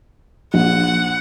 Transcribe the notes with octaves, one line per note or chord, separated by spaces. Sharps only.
A#1 F#5